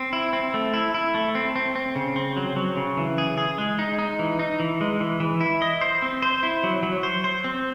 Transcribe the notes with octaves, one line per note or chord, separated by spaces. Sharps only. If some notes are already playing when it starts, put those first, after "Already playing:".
Already playing: C4
E4
C4
A3
E4
E4
A3
C4
C4
C4
C#3
C4
F#3
F#3
C#3
E3
G#4
G#4
G#3
D#4
D#4
E3
D#4
E3
G#3
E3
E3
E4
D#5
C5
C4
C5
E4
F#3
F#3
C5
C5
C4